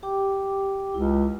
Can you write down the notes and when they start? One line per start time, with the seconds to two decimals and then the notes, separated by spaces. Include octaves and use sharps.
0.03 G4 G5 D6
0.94 C#2 E4